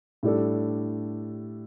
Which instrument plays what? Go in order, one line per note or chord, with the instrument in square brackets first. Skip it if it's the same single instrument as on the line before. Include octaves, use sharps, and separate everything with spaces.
[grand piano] A2 G3 D4 A4